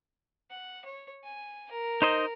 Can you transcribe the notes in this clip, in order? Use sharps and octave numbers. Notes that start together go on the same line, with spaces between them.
F#5
C#5
G#5
A#4
D#4 C5 D#5